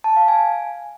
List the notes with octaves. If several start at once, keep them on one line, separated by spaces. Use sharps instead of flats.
A5
F5
G#5